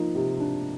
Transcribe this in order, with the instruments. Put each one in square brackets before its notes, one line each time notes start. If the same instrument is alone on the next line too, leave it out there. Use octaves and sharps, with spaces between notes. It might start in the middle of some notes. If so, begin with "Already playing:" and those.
Already playing: [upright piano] F3 A#3 [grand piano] D#4
[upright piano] C3
D4